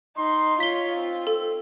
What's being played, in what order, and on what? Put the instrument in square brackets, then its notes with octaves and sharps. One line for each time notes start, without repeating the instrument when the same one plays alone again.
[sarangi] D#4 [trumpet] C6
[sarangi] F4 [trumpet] C#5 [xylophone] B6 G7
[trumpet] C4
[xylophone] A4